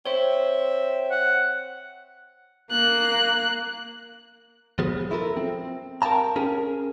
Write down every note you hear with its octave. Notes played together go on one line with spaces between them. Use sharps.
C4 C5 C#5 E5
F#5
A#3 F#6
F3 F#3 B3 G#4
E4 F4 A4 A#4
C4
A#4 F5 G5 A5 A#5
C#4 G#4 A#4